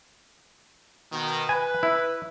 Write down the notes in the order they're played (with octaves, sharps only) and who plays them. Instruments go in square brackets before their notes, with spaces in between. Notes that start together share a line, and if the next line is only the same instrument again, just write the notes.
[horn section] B2 D#3
[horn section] B4 [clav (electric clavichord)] G#5
[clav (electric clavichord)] E4